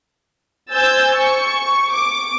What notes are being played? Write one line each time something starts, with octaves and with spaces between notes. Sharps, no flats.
C5 G#5 E6 G6 A6
C#6
D6